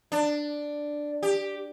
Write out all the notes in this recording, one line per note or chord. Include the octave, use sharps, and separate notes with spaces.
D4
G4